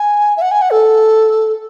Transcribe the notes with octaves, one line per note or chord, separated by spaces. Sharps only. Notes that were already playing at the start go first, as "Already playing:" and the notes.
Already playing: G#5
E5
F#5
G#5
F#5
A4